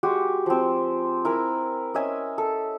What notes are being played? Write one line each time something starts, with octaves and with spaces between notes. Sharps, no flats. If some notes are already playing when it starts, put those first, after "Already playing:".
G#3 F#4 G4
F3 C4
E4 A#4 G#5
C#4 D#5 E5 G#5
A4